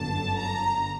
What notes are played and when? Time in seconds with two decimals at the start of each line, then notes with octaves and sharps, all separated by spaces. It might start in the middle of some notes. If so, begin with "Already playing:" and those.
Already playing: G1 F#2 D3 A5
0.36 A#5